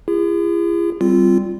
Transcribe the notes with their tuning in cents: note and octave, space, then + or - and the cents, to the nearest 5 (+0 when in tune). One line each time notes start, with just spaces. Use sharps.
E4 +45 G#4 -40
G3 -10 C4 +0 F4 -15